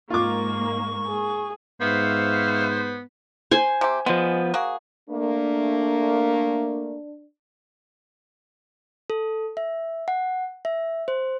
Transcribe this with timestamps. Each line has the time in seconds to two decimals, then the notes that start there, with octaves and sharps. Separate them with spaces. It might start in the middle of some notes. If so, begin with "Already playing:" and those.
0.10 G#2 A#3 F4 C#6 D6
1.07 G#4
1.81 G#2 B3 C5 E5 F5 C#6
3.51 C5 G#5
3.81 C3 G4
4.06 F3 G#3 B3
4.54 A#3 F#4 G#4
5.10 A3 A#3 D4
9.10 A4
9.57 E5
10.08 F#5
10.65 E5
11.08 C5